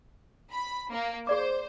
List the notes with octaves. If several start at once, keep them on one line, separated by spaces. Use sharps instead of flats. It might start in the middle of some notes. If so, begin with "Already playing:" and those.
B5
A#3
G#4 C5 D5 D6